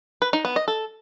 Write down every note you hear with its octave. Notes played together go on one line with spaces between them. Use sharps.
B4
D#4
B3
D#5
A4